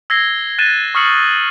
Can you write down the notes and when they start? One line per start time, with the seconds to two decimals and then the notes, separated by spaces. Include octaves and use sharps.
0.10 E6 G#6 A#6 C7 G7
0.58 F#6 A6 A#6 D#7 E7
0.95 C#6 D#6 F6 C7 C#7 F#7